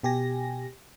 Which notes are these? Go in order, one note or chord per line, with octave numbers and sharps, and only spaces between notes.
B2 G4 G#5 A#6